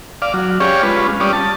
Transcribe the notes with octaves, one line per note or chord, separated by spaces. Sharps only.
D5 F5
F#3
C#4 G4 G#4 C#5 D5 F5
G#3 C#4 F4 B4
G3 C#4 D5 D#6
A5